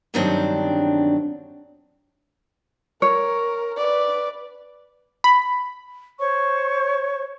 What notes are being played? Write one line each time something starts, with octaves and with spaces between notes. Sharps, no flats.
E2 G2 D#3 F#3 C4 D4
A#4 C#5
B4 D5
B5
C5 C#5 C#6